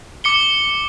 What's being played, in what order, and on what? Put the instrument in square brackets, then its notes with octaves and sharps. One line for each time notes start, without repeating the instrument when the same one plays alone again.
[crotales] D6 C#7 G7